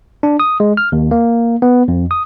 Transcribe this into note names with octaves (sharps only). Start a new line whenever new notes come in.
D4
D#6
G#3
F6
D#2
A#3
B3
F2
D#6